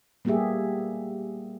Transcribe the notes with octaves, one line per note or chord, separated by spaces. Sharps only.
G3 A#3 B3 G4 G#4 E5